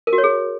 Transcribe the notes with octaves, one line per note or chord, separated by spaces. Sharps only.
A#4
F#4
C#5
G#4